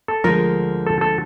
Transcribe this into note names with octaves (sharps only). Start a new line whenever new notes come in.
A4
D2 D3 F3 G#3 A#4
A4
A4